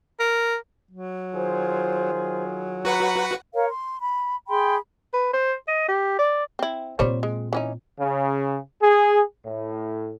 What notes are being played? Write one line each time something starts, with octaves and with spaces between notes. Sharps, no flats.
A#4
F#3
D#3 F4 G#4 C5
F#3
F#4 B4 F#5 A#5
A#4 C#5 F5
C6
B5
G#4 G5 B5 C6
B4
C5
D#5
G4
D5
C4 E4
A#2 G3 C4 C5 C#5
G#3
E3 C#4 D#4
C#3
G#4
A2